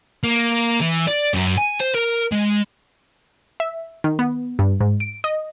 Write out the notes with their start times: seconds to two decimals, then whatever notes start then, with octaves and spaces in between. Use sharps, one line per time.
0.23 A#3
0.80 E3
1.07 D5
1.34 F#2
1.58 G#5
1.80 C5
1.95 A#4
2.32 G#3
3.60 E5
4.04 D#3
4.19 B3
4.59 G2
4.80 G#2
5.00 D7
5.24 D#5